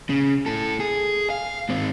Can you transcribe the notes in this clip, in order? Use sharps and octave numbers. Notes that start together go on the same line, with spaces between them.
C#3
A2 A4
G#4
F5
G#2 C4